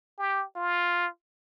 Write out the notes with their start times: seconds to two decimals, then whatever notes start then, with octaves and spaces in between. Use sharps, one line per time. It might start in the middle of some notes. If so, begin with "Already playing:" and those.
0.18 G4
0.56 F4